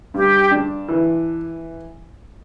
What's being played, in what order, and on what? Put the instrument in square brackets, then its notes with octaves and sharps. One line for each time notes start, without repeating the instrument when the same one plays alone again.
[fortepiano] G2 [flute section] G4
[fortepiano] D4
E3